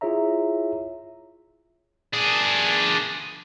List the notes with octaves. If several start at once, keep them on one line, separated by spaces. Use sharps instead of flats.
E4 F4 G#4 C#5 E5 A#5
D4 G#4